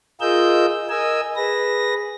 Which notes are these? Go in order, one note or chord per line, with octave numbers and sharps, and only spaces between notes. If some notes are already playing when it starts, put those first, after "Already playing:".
F4 G#4 A#4 D#5 E6 G6
A#4 D#5 G#5 E6
G#4 B4 A#6